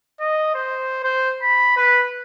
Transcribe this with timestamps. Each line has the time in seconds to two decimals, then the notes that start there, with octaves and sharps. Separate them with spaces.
0.20 D#5
0.54 C5
1.03 C5
1.42 B5
1.76 B4